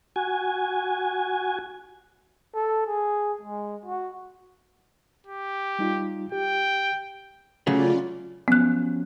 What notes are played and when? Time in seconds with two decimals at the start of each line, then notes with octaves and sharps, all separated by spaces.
0.16 F#4 G#5
2.55 A4
2.87 G#4
3.41 G#3
3.85 F#4
5.27 G4
5.79 G3 D#4 F4
6.32 G4 G5
7.67 C#3 F#3 A3 C#4 F4 D5
8.48 F3 F#3 B3 C#4 F#6